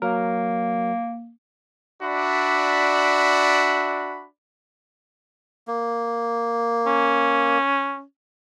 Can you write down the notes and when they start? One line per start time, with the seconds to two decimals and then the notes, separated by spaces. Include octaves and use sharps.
0.02 F#3 A#3 A#4
2.02 D4 F#4 D5 E5 B5
5.68 A#3
6.86 C#4